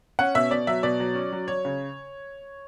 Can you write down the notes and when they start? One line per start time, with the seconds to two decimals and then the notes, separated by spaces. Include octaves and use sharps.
0.19 C#4 F#5
0.35 B2 E5
0.51 B2 D5
0.67 F#3 E5
0.83 B2 D5
1.00 F#3
1.15 C#4
1.32 F#3
1.48 F#3 C#5
1.65 C#3